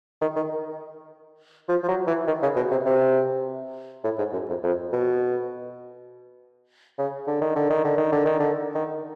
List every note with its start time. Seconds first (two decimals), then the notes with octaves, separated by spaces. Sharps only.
0.22 D#3
0.36 D#3
1.69 F3
1.83 F3
1.88 F#3
2.07 E3
2.27 D#3
2.42 C#3
2.56 B2
2.71 C3
2.86 C3
4.04 A2
4.18 G#2
4.33 F#2
4.49 F2
4.63 F2
4.93 B2
6.98 C#3
7.27 D3
7.41 D#3
7.56 D3
7.70 D#3
7.84 D3
7.98 D#3
8.12 D3
8.26 D#3
8.40 D3
8.75 D#3